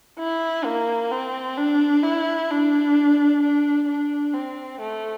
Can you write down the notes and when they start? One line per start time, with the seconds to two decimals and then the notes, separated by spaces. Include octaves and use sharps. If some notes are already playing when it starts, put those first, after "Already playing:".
0.19 E4
0.65 A#3
1.11 C4
1.58 D4
2.03 E4
2.50 D4
3.42 D4
3.88 D4
4.34 C4
4.80 A3